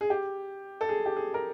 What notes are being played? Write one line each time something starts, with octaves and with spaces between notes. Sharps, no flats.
G#4
G4
A4
G#4
G4
G#4
A#4